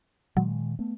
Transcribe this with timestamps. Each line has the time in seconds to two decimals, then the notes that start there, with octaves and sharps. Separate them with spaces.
0.37 A#2 D#3 F#3 G#3
0.79 A3 B3